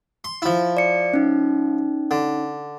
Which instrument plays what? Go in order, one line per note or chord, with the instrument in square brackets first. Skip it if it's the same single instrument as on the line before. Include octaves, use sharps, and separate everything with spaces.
[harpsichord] C6
F3 E4
[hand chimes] D5 C#7
C#4 D#4
[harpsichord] D3